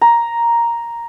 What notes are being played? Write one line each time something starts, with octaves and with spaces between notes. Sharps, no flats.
A#5